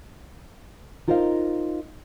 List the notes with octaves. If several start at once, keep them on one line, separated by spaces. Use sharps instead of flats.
D#4 F4 A#4 C5 D#5 F5